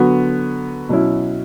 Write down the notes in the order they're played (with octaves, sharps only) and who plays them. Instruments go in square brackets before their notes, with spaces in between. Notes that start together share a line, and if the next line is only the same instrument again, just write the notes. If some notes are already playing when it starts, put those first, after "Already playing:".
Already playing: [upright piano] D3 F#3 B3 F#4
B2 F#3 C#4 E4